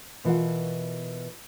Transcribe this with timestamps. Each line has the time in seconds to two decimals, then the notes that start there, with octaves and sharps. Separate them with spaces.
0.25 B2 E3 F4 A#4 F#5